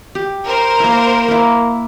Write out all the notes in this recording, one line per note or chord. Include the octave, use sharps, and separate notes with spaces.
G4
A#4 C5
A#3 E4
A#3 E4